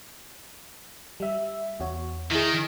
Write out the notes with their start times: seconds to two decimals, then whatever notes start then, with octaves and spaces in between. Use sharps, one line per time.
1.20 G3 E5
1.80 E2 F#4 C#5
2.31 D#3 E4 G#4